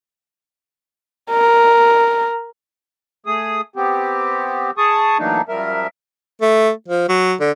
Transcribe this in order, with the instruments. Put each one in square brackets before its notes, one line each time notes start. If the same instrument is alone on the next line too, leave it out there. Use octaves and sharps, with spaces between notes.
[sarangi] A#4
[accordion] A3 G#4 D#6
B3 C4 G4
G#4 A5 C#6 D#6
E3 F#3 A3 A#3 D4 D#4
F#2 F3 G3 A#4 E5
[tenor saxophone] A3
F3
F#3
D3